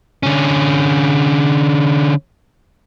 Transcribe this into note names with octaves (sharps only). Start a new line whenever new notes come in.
D3 C#4